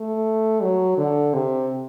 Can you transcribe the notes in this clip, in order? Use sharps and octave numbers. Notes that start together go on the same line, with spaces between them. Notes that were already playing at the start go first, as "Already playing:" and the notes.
Already playing: A3
F#3
D3
C3